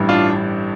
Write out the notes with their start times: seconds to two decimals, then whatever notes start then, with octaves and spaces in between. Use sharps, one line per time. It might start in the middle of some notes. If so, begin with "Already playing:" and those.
Already playing: A1 G2 E3 G3
0.09 D4 F4